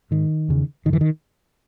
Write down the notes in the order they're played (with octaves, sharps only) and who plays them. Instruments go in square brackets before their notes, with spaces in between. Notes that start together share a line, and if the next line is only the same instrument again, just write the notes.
[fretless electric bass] G#2 D#3
E2 C#3
F#2 D#3
D3 E3
D#3